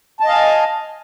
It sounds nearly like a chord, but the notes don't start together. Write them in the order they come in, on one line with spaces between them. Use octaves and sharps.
A5 D#5 F5 G#5